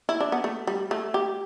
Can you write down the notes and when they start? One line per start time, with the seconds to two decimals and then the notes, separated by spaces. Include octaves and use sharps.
0.09 E4
0.21 D4
0.32 B3
0.44 A3
0.67 G3
0.91 A3
1.14 G4